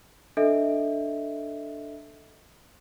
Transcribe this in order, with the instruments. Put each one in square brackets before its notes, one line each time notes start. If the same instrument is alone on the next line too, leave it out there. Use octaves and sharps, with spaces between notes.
[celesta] D4 A4 D#5 E5